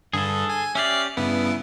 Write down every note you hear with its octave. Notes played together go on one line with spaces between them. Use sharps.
G2 D3 G#4 A4
G#5
C#4 G4 D5 E5 F6 C7
G2 C#3 B3 E4